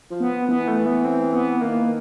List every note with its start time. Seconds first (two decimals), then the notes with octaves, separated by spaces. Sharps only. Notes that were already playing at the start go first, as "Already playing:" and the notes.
0.11 F3
0.20 B3
0.49 E3 B3
0.68 A3
0.86 B3
1.05 C4
1.33 B3
1.61 D#3 A#3